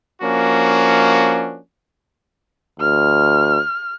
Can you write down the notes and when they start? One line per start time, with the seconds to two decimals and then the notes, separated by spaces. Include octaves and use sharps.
0.22 F3 A#3 C#4 D4 F#4
2.80 D2 F6